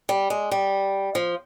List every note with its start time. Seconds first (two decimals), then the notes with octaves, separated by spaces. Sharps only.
0.09 G3
0.30 G#3
0.51 G3
1.15 F3